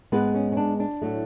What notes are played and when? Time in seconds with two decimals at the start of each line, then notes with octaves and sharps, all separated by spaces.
0.12 G#2 G#3 B3 B4
0.34 C#4
0.52 C#4
0.57 D4
0.80 D4
1.01 A2 F#3 A3